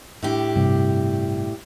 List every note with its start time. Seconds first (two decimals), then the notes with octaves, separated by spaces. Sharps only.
0.23 A2 D4 G4
0.56 G2 C3